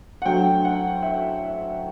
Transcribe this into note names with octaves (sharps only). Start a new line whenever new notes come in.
F#5
D2 D3 F#3 A3 G5
F#5
E5